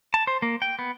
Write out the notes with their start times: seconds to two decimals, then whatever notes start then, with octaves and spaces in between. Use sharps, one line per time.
0.14 A5
0.27 C5
0.42 A#3
0.62 G5
0.79 B3